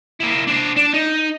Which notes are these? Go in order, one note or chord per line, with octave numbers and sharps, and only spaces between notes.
A#3 E4
D4 C5
D4
D#4